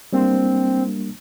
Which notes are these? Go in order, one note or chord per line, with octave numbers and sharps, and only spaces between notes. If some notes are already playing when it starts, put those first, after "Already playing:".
G3 A#3 C4 D4